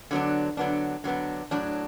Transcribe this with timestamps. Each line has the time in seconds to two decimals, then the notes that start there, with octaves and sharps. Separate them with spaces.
0.11 D3 F#3 B3 D4
0.57 D3 F#3 B3 D4
1.04 D3 F#3 B3 D4
1.51 A2 F#3 D4